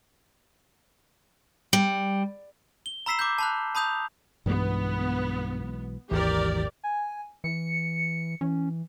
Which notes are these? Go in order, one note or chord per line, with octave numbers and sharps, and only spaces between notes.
G3
G7
A#5 B5 E6 B6 C7 E7
D6 G6
A5 B5 F#6
A5 B5 D#6 G6 F7
B1 G2 E3 G#3 B3
G#1 D#2 E3 G4 A#4 D5
G#5
E3 C#7
E3 C#4